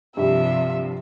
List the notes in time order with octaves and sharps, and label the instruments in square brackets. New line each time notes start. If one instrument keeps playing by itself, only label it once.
[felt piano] G2 G3 [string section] C3 F3 [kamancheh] E5